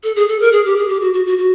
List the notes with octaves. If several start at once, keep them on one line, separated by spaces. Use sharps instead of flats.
A4
G#4
A4
A#4
G#4
G4
G#4
G4
F#4
F#4
F#4
F#4